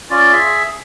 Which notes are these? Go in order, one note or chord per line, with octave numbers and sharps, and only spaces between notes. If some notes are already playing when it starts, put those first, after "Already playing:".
C#4 F4 D5
G#4 E5